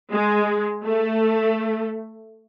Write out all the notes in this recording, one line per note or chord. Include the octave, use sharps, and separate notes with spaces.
G#3
A3